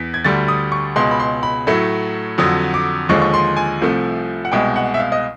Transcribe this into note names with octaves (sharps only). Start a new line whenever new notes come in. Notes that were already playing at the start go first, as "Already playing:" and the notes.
Already playing: E2 B6
G#6
D2 D3 G3 A6
D#6
C#6
C#2 B2 G#3 C6
B5
C6
B5
A2 F#3 A3
F2 D3 F#3 D#6
D6
D#2 D3 F3 G#3 C#6
C#6
C6
G#5
C2 C3 F3 A3
F#5
C2 B2 G#3 G5
F#5
E5
F5
D#5